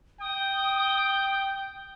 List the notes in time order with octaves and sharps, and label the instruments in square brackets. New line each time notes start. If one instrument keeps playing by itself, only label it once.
[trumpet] G5 [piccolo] D#6